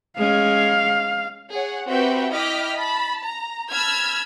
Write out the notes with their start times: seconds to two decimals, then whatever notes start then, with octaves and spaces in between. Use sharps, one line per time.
0.18 G#3 C#4 F5
1.50 G#4 C#5 F#5
1.87 C4 F#4 G4 B4 E5 G5
2.33 E4 D#5 G5 D6 F6 B6
2.76 A5 B5
3.25 A#5
3.72 A5 B5 E6 F6 G#6